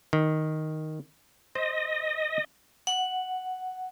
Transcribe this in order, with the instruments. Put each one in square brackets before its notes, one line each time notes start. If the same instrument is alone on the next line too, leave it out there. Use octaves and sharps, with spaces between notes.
[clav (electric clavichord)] D#3
[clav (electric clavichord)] C5 [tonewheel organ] D#5
[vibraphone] F#5